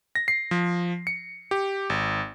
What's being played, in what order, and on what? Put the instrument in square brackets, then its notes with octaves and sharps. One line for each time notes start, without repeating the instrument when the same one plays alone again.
[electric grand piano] A#6
C7
F3
C#7
G4
G#1